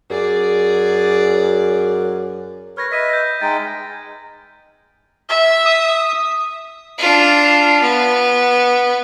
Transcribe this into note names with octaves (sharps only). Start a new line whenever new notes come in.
F#2 G#4 D5
B4 C#5 F6 G#6 A#6
B4 D#5 E5 B6 D#7
G6 A#6
E5
G#3 D#4 G5 A6
E5
D#6
D4 F4
B3